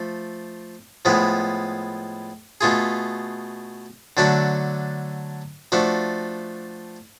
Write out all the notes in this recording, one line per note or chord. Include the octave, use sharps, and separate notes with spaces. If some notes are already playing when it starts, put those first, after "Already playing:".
Already playing: F3 A3
A2 F3 G#3 B3
B2 A3 F4 G#4
D3 F#3 A3 D4 F#4
F3 A3 D4 F#4